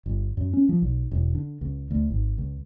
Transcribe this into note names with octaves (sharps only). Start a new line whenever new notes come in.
G1
F#2
C#4
F3
B1
E1
D3
C#2
D2
G#1
C#2